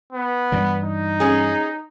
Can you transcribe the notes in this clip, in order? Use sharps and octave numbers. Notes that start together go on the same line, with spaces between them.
B3
G2 E3 G3
D#4
C#4 G#4